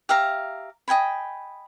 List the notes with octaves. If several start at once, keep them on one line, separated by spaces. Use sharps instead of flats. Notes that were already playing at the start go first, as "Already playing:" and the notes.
G4 E5 F5 A#5
D#5 G5 G#5 B5